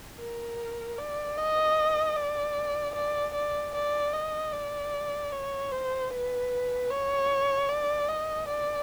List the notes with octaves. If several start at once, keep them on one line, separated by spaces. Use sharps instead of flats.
A#4
D5
D#5
D5
D5
D5
D5
D#5
D5
C#5
C5
B4
C#5
D5
D#5
D5